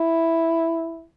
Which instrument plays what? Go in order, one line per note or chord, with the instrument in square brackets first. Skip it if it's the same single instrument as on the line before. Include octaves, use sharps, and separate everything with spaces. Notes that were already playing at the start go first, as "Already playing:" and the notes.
Already playing: [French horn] E4